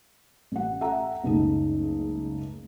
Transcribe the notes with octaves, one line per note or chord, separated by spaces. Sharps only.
A1 F#5
A4 E5 F#5 G5 A#5
F#1 C#2 A3 D#4